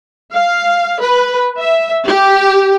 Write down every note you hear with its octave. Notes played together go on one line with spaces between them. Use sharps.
F5
B4
E5
G4